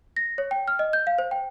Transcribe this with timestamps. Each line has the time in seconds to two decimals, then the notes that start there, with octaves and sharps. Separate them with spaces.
0.16 A#6
0.38 C#5
0.51 G5
0.68 F6
0.79 D#5
0.93 G6
1.07 F5
1.18 C5
1.31 G5